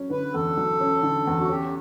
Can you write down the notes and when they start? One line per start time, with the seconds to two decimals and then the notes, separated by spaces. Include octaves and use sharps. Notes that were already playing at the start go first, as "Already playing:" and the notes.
Already playing: F#3 C#4
0.10 D3 B4
0.34 E2 A4
0.57 F#3
0.81 C#4
1.03 D3
1.27 E2
1.41 F#4
1.49 C#4 G4